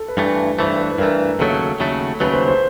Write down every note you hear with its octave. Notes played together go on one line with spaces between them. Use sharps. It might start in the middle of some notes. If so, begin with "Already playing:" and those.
Already playing: A4
B4
G2 E3 A3
G2 E3 A3 C5
B4
G2 E3 A3 A#4
D#2 C#3 F#3 A3 A4
D#2 C#3 F#3 A3
D#2 C#3 F#3 A3 B4
C5
C5